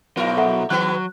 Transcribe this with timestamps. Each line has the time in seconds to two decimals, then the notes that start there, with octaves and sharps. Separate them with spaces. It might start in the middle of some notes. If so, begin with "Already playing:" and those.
0.17 G#2 B2 F#3 E4 A#4
0.37 A4 E5 F#5
0.70 D#3 F#3 G#3 B3 F#6